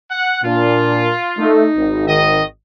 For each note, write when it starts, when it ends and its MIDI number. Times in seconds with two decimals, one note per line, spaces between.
0.10 0.42 78
0.44 1.11 46
0.44 1.09 62
0.44 1.51 65
1.38 1.65 57
1.38 2.05 63
1.76 2.40 32
2.07 2.43 51
2.07 2.43 75